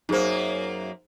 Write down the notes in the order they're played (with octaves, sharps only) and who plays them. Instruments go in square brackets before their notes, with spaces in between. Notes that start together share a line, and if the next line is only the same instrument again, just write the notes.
[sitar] F#2 A#3 [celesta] D#4 G#4 C5